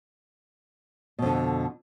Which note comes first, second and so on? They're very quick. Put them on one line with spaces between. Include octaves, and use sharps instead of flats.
B2 F2 D3